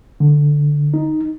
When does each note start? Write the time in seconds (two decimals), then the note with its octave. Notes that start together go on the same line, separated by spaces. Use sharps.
0.20 D3
0.94 D#4